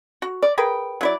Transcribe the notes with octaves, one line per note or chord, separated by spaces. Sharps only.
F#4
D5
G#4 A#4 B4 G5
F#3 E4 D5